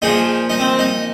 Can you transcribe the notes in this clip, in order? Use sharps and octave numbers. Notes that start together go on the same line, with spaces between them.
A#2 F3 D#4 G#4
D#4
C4
D#4